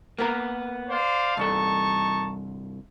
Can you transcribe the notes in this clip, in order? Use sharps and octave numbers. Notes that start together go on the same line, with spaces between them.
A#3 B3 A#4
C5 D5 F5
C2 G2 D#4 A4 A5 C#6